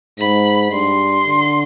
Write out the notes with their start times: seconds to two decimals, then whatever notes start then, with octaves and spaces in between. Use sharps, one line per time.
0.18 G#2 B5
0.72 G2 C6
1.26 D3